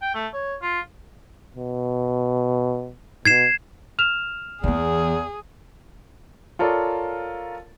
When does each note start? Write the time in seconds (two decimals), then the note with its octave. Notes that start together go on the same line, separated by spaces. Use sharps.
0.02 G5
0.15 A3
0.33 C#5
0.62 F4
1.57 B2
3.25 B2 G#6 C7 E7
3.99 F6 E7 F7
4.64 E2 E3 B3 G#4
6.59 F4 A4 A#4 C#5 D5